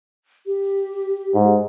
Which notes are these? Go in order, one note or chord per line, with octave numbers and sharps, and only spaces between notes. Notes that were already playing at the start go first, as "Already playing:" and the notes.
G4
G#2